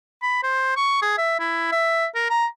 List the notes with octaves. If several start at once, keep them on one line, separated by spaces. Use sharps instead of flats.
B5
C5
C#6
G#4
E5
E4
E5
A#4
A#5